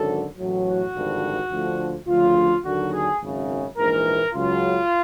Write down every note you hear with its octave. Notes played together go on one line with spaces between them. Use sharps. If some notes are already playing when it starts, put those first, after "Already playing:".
Already playing: G#1 F#2 D3 F#3 A4
A1 A2 F#3
F#4
G#1 G2 D3 F3
D2 D3 F3
D2 C#3 F3 F4
D#2 D3 F#3 F#4
G#4
G#1 F#2 C#3
A#1 G#2 E3 A#4
C#2 C#3 F#3 F4